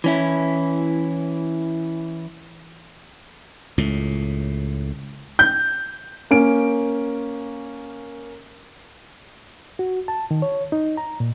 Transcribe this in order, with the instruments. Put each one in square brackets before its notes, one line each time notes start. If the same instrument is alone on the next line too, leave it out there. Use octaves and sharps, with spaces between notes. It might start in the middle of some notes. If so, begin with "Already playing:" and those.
[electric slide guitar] E3 C#4 E4
[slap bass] C#2 A2
[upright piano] G6
A#3 C#4 D7
[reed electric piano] F#4
A5
D#3
C#5
D#4
A#5
A#2